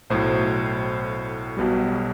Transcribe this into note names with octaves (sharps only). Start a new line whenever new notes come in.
B1 A2 F#3 C5
B1 B2 G3